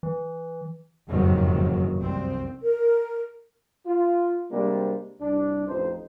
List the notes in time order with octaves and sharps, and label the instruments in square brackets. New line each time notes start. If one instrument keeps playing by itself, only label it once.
[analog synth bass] E3
[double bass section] F#1 F2 G#2 C3 D#3 F#3
C2 C4
[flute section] A#4
[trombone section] F4
C3 G3 G#3 A#3 C4 D4
C2 D4
A1 F2 D#4 C5